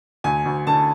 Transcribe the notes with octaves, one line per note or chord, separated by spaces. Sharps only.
D2 G#5
D2
D3 A5